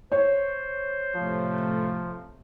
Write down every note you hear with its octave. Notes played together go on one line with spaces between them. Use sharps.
C5 C#5
A2 C3 F3 A3